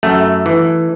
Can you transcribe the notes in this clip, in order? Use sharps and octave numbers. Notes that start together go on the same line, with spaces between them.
F#2 A3
E3